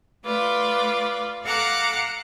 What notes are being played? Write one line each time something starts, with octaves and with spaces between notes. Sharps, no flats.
A3 F4 B4 D5
A4 F5 F#5 A#5 D6 F#6